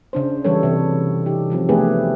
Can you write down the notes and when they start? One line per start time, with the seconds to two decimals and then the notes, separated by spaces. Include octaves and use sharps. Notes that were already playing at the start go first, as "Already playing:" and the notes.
0.13 C#3 D4 C5
0.44 E3 F#3 G3 A4 C#5
0.63 C3 E3
1.26 D#4 G4
1.50 C#3 F3 F#3 C4
1.69 A3 B3 D4 G4 G#4 B4